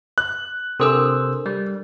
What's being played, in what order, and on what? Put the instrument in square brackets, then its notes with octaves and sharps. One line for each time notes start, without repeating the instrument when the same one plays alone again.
[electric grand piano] F#6
[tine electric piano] C3 C5 E6 [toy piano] D4 A4 A#4
[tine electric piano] G3